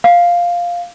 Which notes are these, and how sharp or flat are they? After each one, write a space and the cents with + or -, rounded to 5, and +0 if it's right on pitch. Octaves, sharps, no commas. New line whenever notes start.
F5 +0